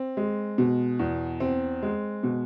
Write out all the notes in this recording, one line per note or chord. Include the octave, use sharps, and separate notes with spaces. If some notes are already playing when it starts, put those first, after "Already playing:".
Already playing: C4
G#3
B2
E2
C4
G#3
B2